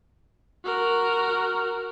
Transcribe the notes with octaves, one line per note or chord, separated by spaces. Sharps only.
F#4 A#4